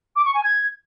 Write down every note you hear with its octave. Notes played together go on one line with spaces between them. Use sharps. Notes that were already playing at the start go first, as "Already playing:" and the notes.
D6
C#6
G#5
G#6